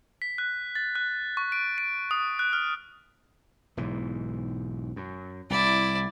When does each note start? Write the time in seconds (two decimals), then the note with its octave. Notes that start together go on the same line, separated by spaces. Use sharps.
0.22 B6
0.38 F#6
0.75 A6
0.95 F#6
1.37 C#6
1.52 D7
1.78 D7
2.11 D#6
2.39 F#6
2.53 F6
3.77 B1 G#2 E3
4.96 F#2
5.50 C2 E4 D5